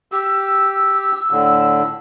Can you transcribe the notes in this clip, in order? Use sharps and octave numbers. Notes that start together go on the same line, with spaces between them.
G4 E6
A2 D3